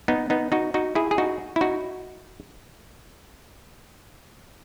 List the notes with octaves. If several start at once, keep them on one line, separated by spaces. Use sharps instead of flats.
B3 D#4
B3 D#4
D#4 F#4
D#4 F#4
E4 G#4
G#4
D#4 F#4
E4
D#4 F#4